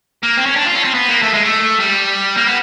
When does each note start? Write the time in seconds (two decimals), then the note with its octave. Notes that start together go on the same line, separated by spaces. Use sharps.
0.23 A#3
0.38 C4
0.46 C#4
0.56 D4
0.66 F4
0.75 C#4
0.84 C4
0.94 B3
1.09 A#3
1.23 A3
1.34 G#3
1.44 A3
1.80 G3
2.37 A#3
2.47 B3